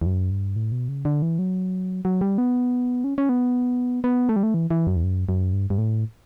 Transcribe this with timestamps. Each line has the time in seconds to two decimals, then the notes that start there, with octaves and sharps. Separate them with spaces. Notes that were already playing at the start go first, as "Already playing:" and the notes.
0.02 E2
0.06 F#2
0.31 G2
0.56 A2
0.72 B2
0.89 C#3
1.05 D3
1.22 E3
1.39 F#3
2.05 F#3
2.21 G3
2.38 B3
3.04 C#4
3.18 C#4
3.29 B3
4.04 B3
4.29 A3
4.36 G3
4.43 A3
4.54 E3
4.71 E3
4.87 F#2
4.96 E2
5.03 F#2
5.29 F#2
5.53 G2
5.70 G2
5.78 A2